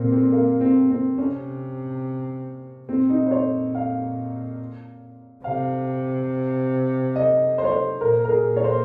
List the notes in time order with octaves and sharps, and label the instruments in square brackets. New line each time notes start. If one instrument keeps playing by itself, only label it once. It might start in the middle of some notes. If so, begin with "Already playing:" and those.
Already playing: [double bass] A#2 [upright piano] A#3 C4
[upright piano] C4
A#3
C4
C4
[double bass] C3 [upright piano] C#4
[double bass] A#2 [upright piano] C4
[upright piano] D#4
C5
C#5
F5
[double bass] C3 [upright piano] F5
[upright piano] D#5
C5
C#5
C5
[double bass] A#2 [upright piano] A#4
[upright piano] A#4
G#4
C#5
C5